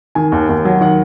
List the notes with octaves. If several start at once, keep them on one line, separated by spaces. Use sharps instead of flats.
D#3 G#5
D#2
D#2
F#3
D#3 F#5